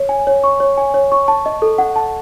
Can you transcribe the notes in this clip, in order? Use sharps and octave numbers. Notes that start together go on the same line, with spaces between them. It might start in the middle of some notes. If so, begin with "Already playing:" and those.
Already playing: C#5
G#5
C#5
C#6
C#5
G#5
C#5
C#6
A5
D#5
A4
F#5
A5